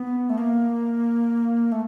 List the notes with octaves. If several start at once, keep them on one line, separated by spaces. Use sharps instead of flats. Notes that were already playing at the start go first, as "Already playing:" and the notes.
Already playing: B3
A3
A#3
A3